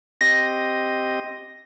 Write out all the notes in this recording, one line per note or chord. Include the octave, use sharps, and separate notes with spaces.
C4 G4 D#5 A#6